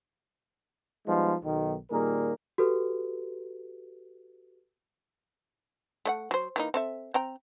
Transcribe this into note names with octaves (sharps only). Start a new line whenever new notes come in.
F3 G3 G#3 B3 D#4
B1 D#3
A#2 D#3 G3 A#3 G#4 A#4
F#4 G4 A4 B4
A3 D#5 F#5
F#3 C5
E3 A#3 D#4
C4 A4 E5
C4 G5 A#5